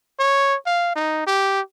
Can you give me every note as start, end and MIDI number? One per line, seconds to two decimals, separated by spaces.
0.19 0.56 73
0.66 0.91 77
0.96 1.25 63
1.27 1.61 67